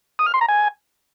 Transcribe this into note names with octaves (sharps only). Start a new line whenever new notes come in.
D#6
F6
C6
A#5
G#5